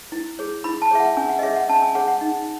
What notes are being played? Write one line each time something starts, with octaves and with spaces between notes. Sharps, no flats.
E4
G#4 C#5
E4 B5
A5
G#4 C#5 E5
F#5
C#4 G#5
F#5
D#5
G#4 C#5 E5
F#5
C#4 A5
G#5
G#4 C#5 F#5
F#5
D#4